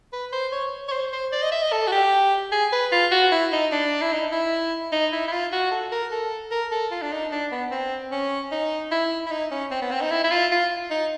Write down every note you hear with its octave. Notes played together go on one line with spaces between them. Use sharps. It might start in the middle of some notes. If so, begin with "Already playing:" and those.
B4
C5
C#5
C#5
C5
C5
D5
D#5
E5
D#5
A4
F#4
G4
G#4
B4
F4
F#4
E4
D#4
D4
E4
D#4
E4
D#4
E4
E4
F4
F#4
A4
A#4
A4
A#4
A4
F4
D4
D#4
D4
B3
C4
C#4
D#4
E4
E4
D#4
C#4
C4
B3
C4
D#4
E4
E4
F4
F4
D#4